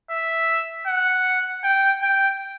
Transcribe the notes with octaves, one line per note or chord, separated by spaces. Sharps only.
E5
F#5
G5
G5